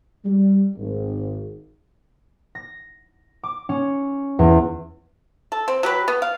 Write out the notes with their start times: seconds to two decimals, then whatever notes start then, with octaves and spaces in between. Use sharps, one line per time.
0.25 G3
0.76 G#1
2.55 A#6
3.43 D6
3.69 C#4
4.39 E2
5.52 A4
5.68 C4
5.83 F#3 G4 B4
6.08 B3
6.22 F5